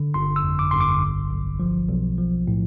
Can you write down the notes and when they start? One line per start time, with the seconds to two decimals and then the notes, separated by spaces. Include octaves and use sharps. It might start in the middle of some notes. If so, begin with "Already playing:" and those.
Already playing: D3
0.14 G1 C6
0.36 E6
0.43 F2
0.59 D6
0.71 G1 C6
0.81 D6
1.01 B1
1.31 B1
1.60 F3
1.89 B1
2.18 F3
2.48 A2